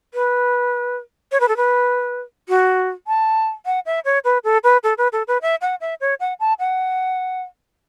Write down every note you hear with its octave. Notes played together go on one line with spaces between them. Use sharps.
B4
C#5
B4
A4
B4
F#4
A5
F#5
E5
C#5
B4
A4
B4
A4
B4
A4
B4
E5
F#5
E5
C#5
F#5
A5
F#5